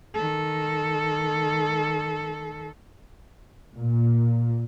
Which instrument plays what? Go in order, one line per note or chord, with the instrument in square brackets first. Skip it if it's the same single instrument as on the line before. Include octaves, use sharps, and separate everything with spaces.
[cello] D#3 A4
[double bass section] A#2